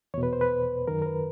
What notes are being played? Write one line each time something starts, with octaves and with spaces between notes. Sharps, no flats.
E2 B2 C#5
B4
C5
B4
F#2 D#3 A#4
A#4
B4